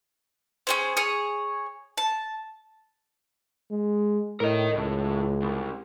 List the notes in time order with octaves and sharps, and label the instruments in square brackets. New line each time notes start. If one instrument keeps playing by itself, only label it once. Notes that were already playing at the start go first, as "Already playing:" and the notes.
[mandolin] C#4 G#4 C5
G#4 C#5
A5
[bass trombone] G#3
[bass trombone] A2 [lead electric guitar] A#4 D#5
[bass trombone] C#2 [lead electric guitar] A2
[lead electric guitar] C2